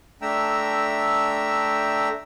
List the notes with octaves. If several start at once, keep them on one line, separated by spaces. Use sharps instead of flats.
A3 D4 E5 G5 A#5 E6